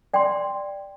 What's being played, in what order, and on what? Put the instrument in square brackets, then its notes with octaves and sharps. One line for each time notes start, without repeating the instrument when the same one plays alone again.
[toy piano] D5 G5 C6